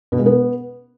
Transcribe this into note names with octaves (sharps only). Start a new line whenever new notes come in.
B2
G#3
B3